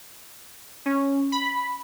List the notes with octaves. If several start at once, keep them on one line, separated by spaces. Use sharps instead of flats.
C#4
B5